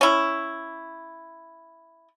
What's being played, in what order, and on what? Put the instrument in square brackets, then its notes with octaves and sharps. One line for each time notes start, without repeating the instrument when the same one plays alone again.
[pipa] C#4 E4